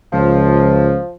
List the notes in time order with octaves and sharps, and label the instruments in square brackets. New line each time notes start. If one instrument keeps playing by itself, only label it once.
[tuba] C#2 [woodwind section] F3